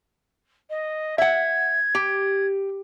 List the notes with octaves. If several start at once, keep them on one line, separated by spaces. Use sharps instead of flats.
D#5
E5 F#5 G#6
G4